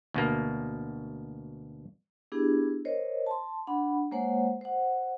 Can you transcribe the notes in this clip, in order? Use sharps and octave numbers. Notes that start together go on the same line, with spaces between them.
D2 B2 A#3
B3 D4 E4 G4 G#4
A#4 C5 C#5 D#5
A5 C6
D4 F#5 B5
G#3 A#3 C5 C#5 F#5
C5 F#5